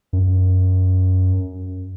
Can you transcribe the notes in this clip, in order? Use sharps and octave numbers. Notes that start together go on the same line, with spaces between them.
F#2